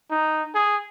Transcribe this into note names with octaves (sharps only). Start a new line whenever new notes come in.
D#4
G#4